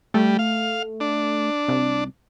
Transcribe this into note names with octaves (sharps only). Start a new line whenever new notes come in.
G3 A3
F5
D4
C2